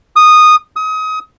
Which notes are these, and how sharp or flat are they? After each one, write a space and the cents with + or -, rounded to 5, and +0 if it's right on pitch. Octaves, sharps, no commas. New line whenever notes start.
D#6 -10
D#6 +30